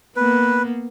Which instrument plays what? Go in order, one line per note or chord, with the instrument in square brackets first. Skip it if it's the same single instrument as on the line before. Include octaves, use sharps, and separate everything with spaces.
[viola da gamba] A#3 B3 [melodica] B4